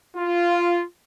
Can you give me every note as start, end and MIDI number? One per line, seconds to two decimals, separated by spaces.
0.16 0.82 65